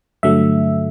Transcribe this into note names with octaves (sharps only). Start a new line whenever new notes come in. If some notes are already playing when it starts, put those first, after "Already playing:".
G2 D3 F#3 A3 E5